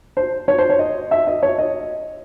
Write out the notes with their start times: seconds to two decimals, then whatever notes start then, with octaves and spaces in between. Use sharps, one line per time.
0.17 C5
0.48 C#5
0.58 C5
0.70 C#5
0.79 D#5
1.11 E5
1.27 D#5
1.43 C#5
1.58 D#5